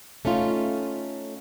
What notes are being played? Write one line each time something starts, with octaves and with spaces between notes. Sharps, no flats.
A3 C#4 D#4 F4